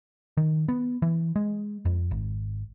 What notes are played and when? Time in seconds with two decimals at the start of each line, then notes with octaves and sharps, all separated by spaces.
0.37 D#3
0.68 B3
1.02 E3
1.36 G#3
1.85 F2
2.11 G#1